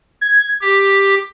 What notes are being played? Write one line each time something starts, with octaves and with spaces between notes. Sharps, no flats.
G#6
G4